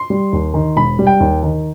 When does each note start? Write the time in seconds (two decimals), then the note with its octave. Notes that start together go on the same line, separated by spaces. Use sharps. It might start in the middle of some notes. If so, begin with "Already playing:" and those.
Already playing: C6
0.10 G3
0.33 D#2
0.54 D#3
0.76 E1 B5
0.99 G3
1.07 G5
1.20 D#2
1.43 D#3